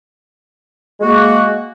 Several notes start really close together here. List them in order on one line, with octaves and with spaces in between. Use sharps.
G#3 F#4 A#3